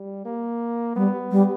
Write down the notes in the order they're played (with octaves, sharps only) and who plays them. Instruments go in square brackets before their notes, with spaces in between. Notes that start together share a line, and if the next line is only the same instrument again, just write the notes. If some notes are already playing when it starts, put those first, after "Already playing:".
Already playing: [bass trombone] G3
A#3
[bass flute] G3 [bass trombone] B3
[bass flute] G3